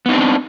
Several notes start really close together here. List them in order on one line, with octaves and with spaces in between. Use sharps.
B3 D#4 C4 D4